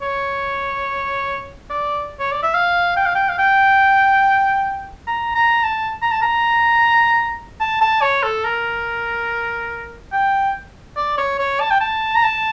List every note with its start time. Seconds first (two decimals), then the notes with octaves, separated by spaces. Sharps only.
0.02 C#5
1.70 D5
2.20 C#5
2.32 D5
2.43 E5
2.54 F5
2.97 G5
3.06 F5
3.15 G5
3.29 F5
3.38 G5
5.07 A#5
5.35 A#5
5.63 A5
6.02 A#5
6.11 A5
6.22 A#5
7.60 A5
7.81 A5
8.02 C#5
8.23 A4
8.44 A#4
10.12 G5
10.97 D5
11.18 C#5
11.39 C#5
11.60 A5
11.71 G5
11.81 A5
12.15 A#5
12.23 A5